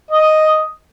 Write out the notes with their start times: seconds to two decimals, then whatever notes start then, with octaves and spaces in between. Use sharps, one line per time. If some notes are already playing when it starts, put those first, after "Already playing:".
0.11 D#5